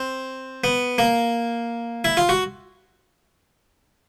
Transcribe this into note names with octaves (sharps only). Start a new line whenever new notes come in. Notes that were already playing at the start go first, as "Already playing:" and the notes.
Already playing: C4
B3
A#3
E4
F4
F#4